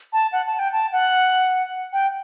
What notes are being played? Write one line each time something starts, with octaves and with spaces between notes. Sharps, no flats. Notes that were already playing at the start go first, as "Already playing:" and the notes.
A5
F#5
A5
G5
A5
F#5
G5